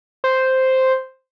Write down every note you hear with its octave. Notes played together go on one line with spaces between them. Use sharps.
C5